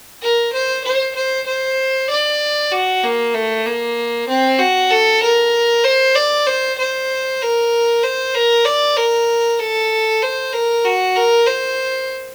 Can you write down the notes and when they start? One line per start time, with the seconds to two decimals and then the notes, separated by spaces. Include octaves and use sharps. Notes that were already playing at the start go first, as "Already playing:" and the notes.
0.22 A#4
0.53 C5
0.84 C5
1.15 C5
1.46 C5
2.10 D5
2.71 F#4
3.03 A#3
3.34 A3
3.66 A#3
4.28 C4
4.59 F#4
4.91 A4
5.22 A#4
5.84 C5
6.16 D5
6.47 C5
6.78 C5
7.41 A#4
8.03 C5
8.34 A#4
8.65 D5
8.96 A#4
9.60 A4
10.22 C5
10.53 A#4
10.85 F#4
11.16 A#4
11.46 C5